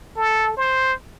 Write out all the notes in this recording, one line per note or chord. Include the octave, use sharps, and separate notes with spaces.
A4
C5